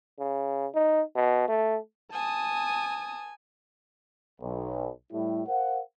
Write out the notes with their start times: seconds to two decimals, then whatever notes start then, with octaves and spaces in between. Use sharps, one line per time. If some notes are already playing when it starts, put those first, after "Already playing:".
0.19 C#3
0.75 D#4
1.16 B2
1.48 A3
2.13 G#5 A5 D#6
4.41 B1
5.12 A2 G3 E4
5.47 A#4 C5 F5 F#5